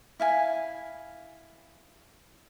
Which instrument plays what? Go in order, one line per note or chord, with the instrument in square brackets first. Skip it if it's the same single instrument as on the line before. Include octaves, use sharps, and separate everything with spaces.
[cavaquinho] E4 F5 G#5